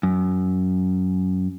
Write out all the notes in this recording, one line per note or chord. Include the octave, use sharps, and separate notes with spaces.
F#2